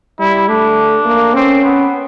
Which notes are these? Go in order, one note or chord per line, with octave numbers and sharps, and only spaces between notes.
G3 E4
A3 D4
A#3
C4 C#4
B3